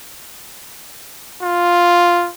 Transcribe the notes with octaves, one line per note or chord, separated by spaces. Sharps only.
F4